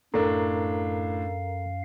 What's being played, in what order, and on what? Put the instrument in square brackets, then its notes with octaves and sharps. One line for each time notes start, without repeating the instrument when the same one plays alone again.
[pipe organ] F#2 F5 [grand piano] A2 D4 [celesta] A4 [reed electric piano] A#4 A#5